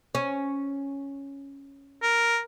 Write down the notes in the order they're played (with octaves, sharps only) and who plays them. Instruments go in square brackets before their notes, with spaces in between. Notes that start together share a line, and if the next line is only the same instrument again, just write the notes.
[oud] C#4
[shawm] A#4